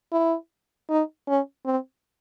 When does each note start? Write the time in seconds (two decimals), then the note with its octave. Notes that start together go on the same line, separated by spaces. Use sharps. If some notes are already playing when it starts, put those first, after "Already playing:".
0.12 E4
0.90 D#4
1.28 C#4
1.66 C4